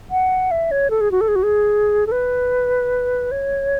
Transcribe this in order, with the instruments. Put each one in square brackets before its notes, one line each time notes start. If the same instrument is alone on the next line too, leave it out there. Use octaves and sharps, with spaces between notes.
[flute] F#5
E5
C#5
A4
G#4
F#4
A4
G#4
F#4
G#4
A4
B4
C#5